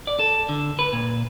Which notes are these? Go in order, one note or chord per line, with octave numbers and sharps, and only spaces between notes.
D5
A4
D3
B4
A#2